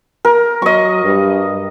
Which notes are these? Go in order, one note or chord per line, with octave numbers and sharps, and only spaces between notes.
A#4
F#3 D#5 C#6
G2